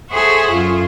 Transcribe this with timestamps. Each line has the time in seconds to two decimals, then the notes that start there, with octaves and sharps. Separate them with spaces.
0.10 G#4 A4 C5 C#5 E5 F#5
0.52 F#2 F4